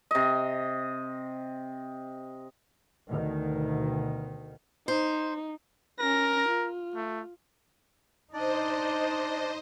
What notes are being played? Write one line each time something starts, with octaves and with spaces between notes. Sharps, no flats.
C3 D#5
D2 B2 D#3
D#4 C5
C#4 A#4 A#6
F4
A3
D4 D#4 C5 D5 D#5